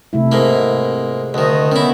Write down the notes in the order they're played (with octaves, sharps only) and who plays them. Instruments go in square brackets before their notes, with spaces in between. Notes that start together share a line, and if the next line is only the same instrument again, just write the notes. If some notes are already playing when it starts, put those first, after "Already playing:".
[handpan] C3 A3 E4
[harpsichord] G#2 A#3
[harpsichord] D2 D#3 [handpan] D#5
[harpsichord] D#3 E4 [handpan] B3 C#4